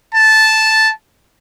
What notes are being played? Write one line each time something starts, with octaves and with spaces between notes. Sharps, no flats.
A5